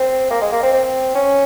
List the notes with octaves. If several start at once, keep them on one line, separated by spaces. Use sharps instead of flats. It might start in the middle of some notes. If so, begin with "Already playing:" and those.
Already playing: C4
A#3
G#3
A#3
C4
C4
C#4